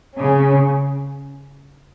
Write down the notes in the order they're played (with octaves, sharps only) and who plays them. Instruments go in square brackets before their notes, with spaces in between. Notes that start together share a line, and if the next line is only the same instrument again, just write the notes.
[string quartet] C#3 C#4